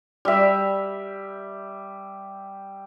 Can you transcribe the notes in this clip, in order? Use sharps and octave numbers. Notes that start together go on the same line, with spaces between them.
G3 E5